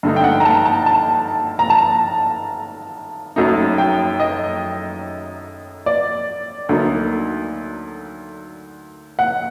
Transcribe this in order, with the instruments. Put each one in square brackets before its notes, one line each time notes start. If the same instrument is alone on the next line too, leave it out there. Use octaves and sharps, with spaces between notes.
[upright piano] G2 D3 A3 D#4
G5
F#5
A#5
A5
A5
A5
A#5
A5
F#1 F#2 F#3 A3 D#4
G5
D#5
D5
D2 D3 F#3 A#3 D#4
F#5